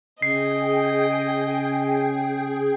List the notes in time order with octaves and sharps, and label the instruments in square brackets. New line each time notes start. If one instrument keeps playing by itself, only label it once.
[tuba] C#3 [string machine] G#4 G5 [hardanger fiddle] D#5 [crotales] C7